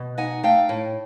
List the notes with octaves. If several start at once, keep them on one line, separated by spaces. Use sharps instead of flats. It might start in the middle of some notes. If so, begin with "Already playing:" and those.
Already playing: B2
D#4 F#5 G#5
A3 F5 G5
A2